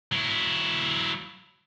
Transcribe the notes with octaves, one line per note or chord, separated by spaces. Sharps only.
F#3 E4